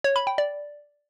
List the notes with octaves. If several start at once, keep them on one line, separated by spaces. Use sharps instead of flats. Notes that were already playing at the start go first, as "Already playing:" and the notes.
C#5
B5
G5
D5